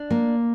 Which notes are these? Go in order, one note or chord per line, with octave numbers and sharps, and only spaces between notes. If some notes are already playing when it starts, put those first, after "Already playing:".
Already playing: D4
A#3